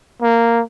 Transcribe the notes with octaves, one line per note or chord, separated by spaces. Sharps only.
A#3